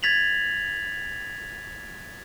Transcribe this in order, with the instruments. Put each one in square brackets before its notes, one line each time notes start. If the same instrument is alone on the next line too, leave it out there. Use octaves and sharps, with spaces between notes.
[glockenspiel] G#6 A6 B6 F7 F#7